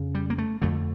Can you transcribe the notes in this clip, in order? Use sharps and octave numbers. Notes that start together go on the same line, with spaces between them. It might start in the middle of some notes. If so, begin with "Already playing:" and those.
Already playing: F2 C#3
G3
A#3
A3
F2 D3 A3